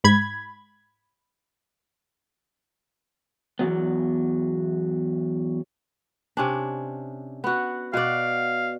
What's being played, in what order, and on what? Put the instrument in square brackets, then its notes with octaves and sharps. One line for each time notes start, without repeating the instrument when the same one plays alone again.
[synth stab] G#2 B5 G#6
[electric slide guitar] E2 G#2 F#3 B3
[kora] C3 C#4 D4
B3 F#4
[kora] B2 F#4 D5 [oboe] F5